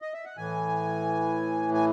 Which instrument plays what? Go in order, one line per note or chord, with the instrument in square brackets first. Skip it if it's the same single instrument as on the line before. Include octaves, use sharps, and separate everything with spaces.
[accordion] D#5
E5
F#5
A2 E3 G#5
G#5